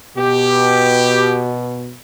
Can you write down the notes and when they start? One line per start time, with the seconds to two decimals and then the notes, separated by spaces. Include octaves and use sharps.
0.17 B2 G4